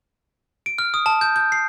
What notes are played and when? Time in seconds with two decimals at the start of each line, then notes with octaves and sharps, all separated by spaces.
0.66 D7
0.78 F6
0.94 D#6
1.06 A5
1.21 G6
1.36 G6
1.52 C7